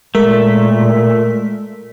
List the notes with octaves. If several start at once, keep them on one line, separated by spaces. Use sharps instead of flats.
A#2 G#3 A3 A#4 B6